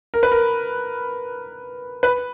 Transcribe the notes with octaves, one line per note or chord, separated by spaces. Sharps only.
A#4
B4
A#4
B4